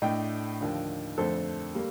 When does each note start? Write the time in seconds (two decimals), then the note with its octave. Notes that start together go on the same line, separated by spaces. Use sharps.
0.02 A2 A3 D4 D#5 G5
0.61 D#2 D3 F3
1.18 F2 D3 A3 C4 A4 C5
1.75 G3 A#3